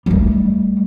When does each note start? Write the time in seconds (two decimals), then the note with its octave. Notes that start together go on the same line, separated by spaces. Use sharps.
0.06 G3 A3